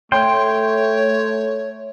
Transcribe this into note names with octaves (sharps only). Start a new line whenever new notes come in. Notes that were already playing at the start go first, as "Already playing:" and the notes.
A3 C#5 G5 C6